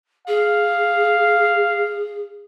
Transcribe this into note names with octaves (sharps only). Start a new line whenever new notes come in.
G#4 F5